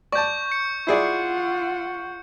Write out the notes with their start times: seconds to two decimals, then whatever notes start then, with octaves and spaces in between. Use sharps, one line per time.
0.12 D5 A5 C#6 G6
0.52 C#7
0.87 E4 F4 G#4 D5 F#5